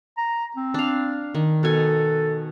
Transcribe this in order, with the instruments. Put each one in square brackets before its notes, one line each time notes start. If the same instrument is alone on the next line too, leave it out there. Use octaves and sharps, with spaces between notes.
[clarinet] A#5
C4
[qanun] D4 F5
D#3
[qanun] B2 G#5 [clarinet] A4